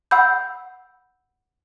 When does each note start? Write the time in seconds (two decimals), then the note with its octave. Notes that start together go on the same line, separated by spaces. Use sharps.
0.11 F#5 B5 E6 G6